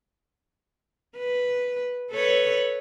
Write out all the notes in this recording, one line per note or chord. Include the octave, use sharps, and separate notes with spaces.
B4
A4 B4 C#5